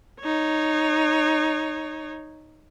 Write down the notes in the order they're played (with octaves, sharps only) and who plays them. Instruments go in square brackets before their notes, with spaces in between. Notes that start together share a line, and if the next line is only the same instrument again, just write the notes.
[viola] D#4 C#5